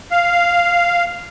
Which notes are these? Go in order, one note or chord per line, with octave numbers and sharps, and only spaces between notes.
F5